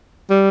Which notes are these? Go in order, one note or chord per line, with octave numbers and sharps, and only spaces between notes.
G3